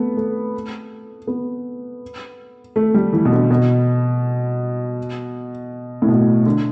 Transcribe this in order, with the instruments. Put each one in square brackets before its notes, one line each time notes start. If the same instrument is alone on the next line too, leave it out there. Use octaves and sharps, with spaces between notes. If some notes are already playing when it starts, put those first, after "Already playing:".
Already playing: [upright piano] A3 B3
A3
B3
A3
G3
E3
B2
D3
B2
A2
B2
D3